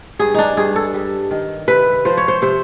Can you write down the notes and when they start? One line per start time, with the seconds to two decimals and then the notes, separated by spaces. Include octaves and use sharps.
0.19 G2 G#4
0.34 D4 D#4
0.57 G2 G#4
0.76 A4
0.94 G3
1.31 D#3
1.68 C3 B4
2.05 F3 C5
2.17 C#5
2.28 C5
2.42 C3 C5